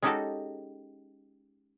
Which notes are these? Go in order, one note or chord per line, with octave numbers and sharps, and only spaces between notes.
G#3 C#4 D#4 F#4 G4 A4